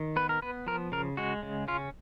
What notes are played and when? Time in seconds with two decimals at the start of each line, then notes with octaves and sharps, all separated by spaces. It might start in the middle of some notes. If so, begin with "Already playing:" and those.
Already playing: D#3
0.16 B3 B4
0.29 A#4
0.42 B3 B4
0.67 F3 A#4
0.92 C#3 A#4
1.17 G#3 F#4
1.43 C#3
1.68 C#4 F4